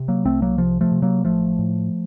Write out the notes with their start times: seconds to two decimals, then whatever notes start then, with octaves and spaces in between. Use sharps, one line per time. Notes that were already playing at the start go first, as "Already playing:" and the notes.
Already playing: C3
0.08 F#3 A#3
0.25 C2 A3 C4
0.42 F#3 A#3
0.58 C3 F3
0.81 F3 A3
0.92 C3
1.02 F#3 A#3
1.25 A1 F3 A3
1.58 A2